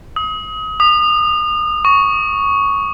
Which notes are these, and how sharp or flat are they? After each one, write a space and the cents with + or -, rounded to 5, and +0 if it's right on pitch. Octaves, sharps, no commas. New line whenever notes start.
D#6 +30
D#6 -35
C#6 +10